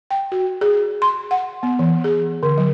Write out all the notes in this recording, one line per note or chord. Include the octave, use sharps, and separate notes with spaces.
G5
F#4
G#4
C6
F#5
B3
E3
G#4
D3
F#3